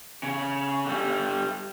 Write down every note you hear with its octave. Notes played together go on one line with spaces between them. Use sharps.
C#3
D3 G3